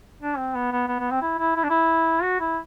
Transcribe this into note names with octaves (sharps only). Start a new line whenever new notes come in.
D4
C4
B3
B3
B3
B3
C4
E4
E4
E4
D4
E4
F#4
E4